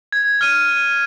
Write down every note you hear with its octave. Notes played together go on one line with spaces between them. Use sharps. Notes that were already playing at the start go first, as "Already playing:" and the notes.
G#6
F6 D#7